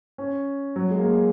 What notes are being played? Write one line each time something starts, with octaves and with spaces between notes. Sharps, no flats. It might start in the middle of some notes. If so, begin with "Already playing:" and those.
C#4
F#3
G#3
A#3
G#3